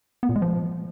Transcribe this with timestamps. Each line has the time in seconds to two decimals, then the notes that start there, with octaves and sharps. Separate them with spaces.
0.23 B3
0.29 A#2
0.36 G#3
0.42 F3